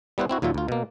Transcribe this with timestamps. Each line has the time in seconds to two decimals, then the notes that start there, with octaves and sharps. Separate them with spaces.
0.18 G3 B3 E4 B4 C5
0.29 C4 E4 F#4
0.42 D#2 A#2 F#3 F4 E5
0.54 D2 F4
0.68 B2 A#3